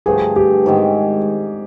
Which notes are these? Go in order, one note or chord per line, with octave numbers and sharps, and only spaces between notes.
G2 D3 F3 A3 G#4
G4
G#2 D#3 G#3